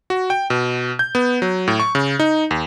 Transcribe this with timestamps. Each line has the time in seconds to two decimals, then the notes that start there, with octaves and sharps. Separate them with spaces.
0.10 F#4
0.30 G5
0.50 B2
0.99 G6
1.15 B3
1.42 F#3
1.68 A2
1.80 C#6
1.95 C#3
2.19 D#4
2.51 D#2